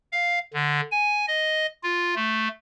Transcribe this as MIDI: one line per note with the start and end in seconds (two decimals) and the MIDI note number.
0.12 0.39 77
0.53 0.80 50
0.92 1.26 80
1.28 1.66 75
1.83 2.15 65
2.16 2.48 57